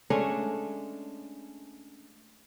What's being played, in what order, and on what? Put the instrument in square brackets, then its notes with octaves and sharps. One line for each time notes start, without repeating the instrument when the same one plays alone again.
[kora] G#3 A3 C#4 D4